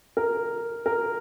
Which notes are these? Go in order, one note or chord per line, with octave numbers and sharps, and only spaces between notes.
A#4
A#4